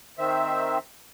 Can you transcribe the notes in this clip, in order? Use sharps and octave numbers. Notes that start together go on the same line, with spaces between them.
D#3 C4 E5